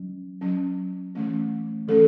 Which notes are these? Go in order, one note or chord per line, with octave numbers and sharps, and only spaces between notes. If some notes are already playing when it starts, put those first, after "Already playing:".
Already playing: F#3 C#4
F#3 C#4
E3 A3 C#4
E3 A3 C#4 A4